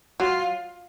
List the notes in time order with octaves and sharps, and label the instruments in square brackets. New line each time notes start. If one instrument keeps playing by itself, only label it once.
[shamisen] F#3 [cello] F4